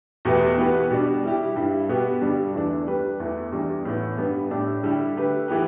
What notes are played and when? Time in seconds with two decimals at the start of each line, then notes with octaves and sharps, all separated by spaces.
0.25 E2 B2 A3 G4 B4
0.58 E3 B3 G4 B4
0.90 B2 G3 D4
1.24 G3 E4 G4
1.56 G2 G3 E4
1.89 B2 B3 G4 B4
2.21 G2 D3 G3 D4
2.55 E2 E3 A3 D4
2.87 G3 D4 G4 B4
3.20 E2 E3 A3
3.52 E2 E3 G3 D4
3.85 A2 E3 B3
4.18 G2 G3 B3
4.51 A2 A3 D4 G4
4.83 D3 G3 E4 G4
5.16 D3 A3 G4 B4
5.48 E3 B3 G4 B4